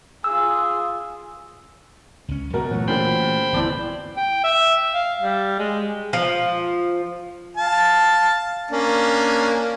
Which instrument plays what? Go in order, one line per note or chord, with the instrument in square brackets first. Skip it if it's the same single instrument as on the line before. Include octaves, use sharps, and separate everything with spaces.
[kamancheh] F4 G#4 [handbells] E6
[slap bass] C#2 C#4
[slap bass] F#2 [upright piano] B2 A#4
[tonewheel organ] A#2 F#3 [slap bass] E3 A3
[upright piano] A#2 C#3 F#3 [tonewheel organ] C5 G5 B5
[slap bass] G1 E2 [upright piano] E3 D5 A5
[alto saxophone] G5
E5
F5
G3
G#3
[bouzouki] F3
[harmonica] F5 A5
A#3 C#4 D4